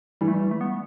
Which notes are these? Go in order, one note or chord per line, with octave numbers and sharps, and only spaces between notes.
E3 G3
A3
G3
A3
B3